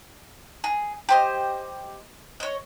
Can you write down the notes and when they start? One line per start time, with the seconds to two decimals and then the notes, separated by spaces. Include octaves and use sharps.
0.64 G#4
1.09 G4 C5 D#5
2.40 C#5 D#5